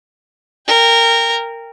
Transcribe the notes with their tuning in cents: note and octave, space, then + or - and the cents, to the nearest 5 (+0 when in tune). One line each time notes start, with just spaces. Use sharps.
A#4 -15 G5 +20